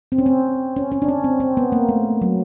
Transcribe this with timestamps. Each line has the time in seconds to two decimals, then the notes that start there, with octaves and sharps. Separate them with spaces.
0.12 C4
0.18 C#4
0.26 C4
0.76 C#4
0.92 C#4
1.02 D4
1.08 C#4
1.24 C4
1.40 C4
1.57 B3
1.72 A#3
1.89 A3
2.22 F#3